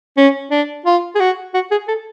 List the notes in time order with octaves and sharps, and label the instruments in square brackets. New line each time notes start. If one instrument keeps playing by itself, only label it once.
[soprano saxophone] C#4
D4
F4
G#4
F#4
F#4
G#4
A4